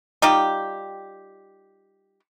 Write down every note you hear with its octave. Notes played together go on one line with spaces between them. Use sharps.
G3 D#4 F4 G4